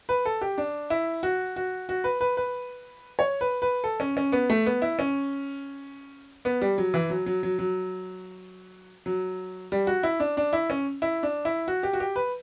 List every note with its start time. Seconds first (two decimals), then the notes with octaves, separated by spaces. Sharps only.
0.09 B4
0.25 A4
0.41 G4
0.58 D4
0.90 E4
1.23 F#4
1.56 F#4
1.89 F#4
2.04 B4
2.21 B4
2.37 B4
3.19 C#5
3.41 B4
3.62 B4
3.84 A4
4.00 C#4
4.17 C#4
4.32 B3
4.50 A3
4.66 B3
4.82 E4
4.99 C#4
6.45 B3
6.61 G3
6.78 F#3
6.94 E3
7.10 F#3
7.26 F#3
7.43 F#3
7.59 F#3
9.06 F#3
9.72 G3
9.87 F#4
10.03 E4
10.20 D4
10.37 D4
10.53 E4
10.70 C#4
11.02 E4
11.23 D4
11.45 E4
11.68 F#4
11.83 G4
11.93 F#4
12.00 G4
12.16 B4